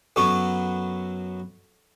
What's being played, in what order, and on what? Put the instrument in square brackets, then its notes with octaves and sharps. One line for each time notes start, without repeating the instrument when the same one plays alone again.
[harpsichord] F#2 F#3 B3 [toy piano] A4 C#6